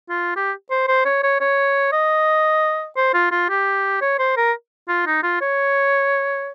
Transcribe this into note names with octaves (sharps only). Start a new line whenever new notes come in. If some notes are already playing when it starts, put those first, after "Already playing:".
F4
G4
C5
C5
C#5
C#5
C#5
D#5
C5
F4
F4
G4
C#5
C5
A#4
F4
D#4
F4
C#5